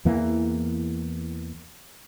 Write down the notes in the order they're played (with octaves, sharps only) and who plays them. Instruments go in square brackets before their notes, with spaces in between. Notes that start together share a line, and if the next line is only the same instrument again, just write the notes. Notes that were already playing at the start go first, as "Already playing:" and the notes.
[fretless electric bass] E2 E3 A#3